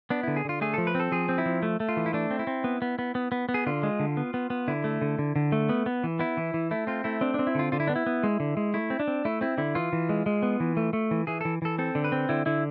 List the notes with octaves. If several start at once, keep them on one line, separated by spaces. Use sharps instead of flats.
B3 D4
D3 E4
G#4
D3 F4
A3 G#4
F3 A4
B4
C4 A4
F3 G#4
C4
E4
F3
A3
A3
F4
E3
E4
A3 D4
C4
E4
C4
B3
B3
B3
B3
B3
B3
G#4
D3 F4
G#3
D3
B3
B3
B3
D3 E4
A3
D3
D3
D3
A3
B3
B3
E3
B3 E4
E3
E3
A3 E4
C4 F4
A3 E4
C4 D4
C4 D4
E4
D3 F4
D3 F4
E4
B3 D4
E4
B3
G#3
D3
G#3
A3 E4
C4
D4
C4
A3 E4
C4 E4
D3 E4
E3 F4
E3
G#3
G#3
B3
E3
A3
A3
E3
E3 G#4
E3 A4
E3 A4
C4 A4
D3
B4
C4
D3 E4
D3 E4